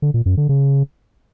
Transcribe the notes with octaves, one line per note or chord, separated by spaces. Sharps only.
D3
A#2
F#2
D3
C#3